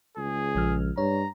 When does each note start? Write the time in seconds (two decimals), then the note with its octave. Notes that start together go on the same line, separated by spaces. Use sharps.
0.17 C#2 G#4
0.55 A#1 F3 F6
0.98 G2 C#5 A#5